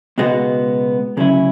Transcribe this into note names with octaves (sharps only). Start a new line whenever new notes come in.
C#2 B2 G#3 B3 F#4
D2 C#3 F#3 C#4 E4